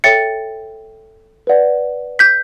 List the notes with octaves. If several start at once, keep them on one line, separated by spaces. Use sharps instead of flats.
A4 C#5 E5 G5 A6 C#7
B4 D5 F#5
G6 B6